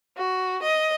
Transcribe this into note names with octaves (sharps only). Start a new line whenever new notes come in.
F#4
D#5